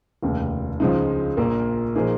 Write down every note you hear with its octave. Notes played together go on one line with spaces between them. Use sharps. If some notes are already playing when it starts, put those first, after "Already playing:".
F1 D#2 C#3
C#2 C#3 F3 G#3 D#4
A#1 A#2 A#3
A#2 F3 A#3 D#4 G#4